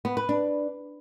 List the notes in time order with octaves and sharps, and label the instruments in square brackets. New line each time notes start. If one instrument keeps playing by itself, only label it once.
[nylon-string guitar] B3
B4
D4